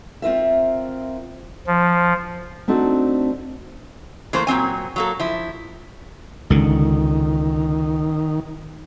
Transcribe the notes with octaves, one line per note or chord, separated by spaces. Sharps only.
C4 F4 A#4 E5
F3
A3 C4 D4 D#4 F#4
E3 A3 A#3 C5
A#2 F#3 C4 G#5
F#3 A#3 A4
F3 E4
C#2 D3 D#3